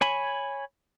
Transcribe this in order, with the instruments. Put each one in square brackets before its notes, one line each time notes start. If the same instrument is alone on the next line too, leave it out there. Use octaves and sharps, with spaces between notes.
[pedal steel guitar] C#5 G#5 B5